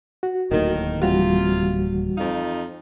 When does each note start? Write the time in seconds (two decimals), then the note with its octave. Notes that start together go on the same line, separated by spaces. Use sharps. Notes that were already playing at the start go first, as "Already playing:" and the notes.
0.23 F#4
0.51 D1 D#2 A2 D#3
1.02 C3 E3 G3 F4 F#4
2.17 F2 D#4 F5